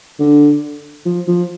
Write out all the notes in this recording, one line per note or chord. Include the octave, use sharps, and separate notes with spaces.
D3
F3
F3